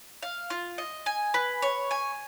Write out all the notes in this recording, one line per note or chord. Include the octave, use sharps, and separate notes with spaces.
F5
F4
D#5
G#5
B4
C#5
G#5